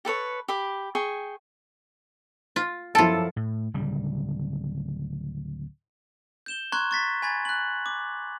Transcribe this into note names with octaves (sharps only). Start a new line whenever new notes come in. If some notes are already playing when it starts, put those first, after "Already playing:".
G4 A4 B4 C#5
G4 B5 D6
G#4 G5 C#6
F4
F#2 F3 E4 F4 A4 A5
A2
D1 C#3 G3
G6 E7 G7
A#5 C6 C#6 F#6 G#6
C#6 A6 B6
G#5 B5 G#6 A6
F#6 F#7
D6